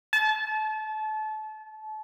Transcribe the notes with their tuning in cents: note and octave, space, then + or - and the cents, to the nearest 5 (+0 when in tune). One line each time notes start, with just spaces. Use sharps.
A5 -30